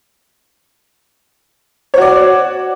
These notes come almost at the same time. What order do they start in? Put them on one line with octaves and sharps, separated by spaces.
C#5 F#4 D5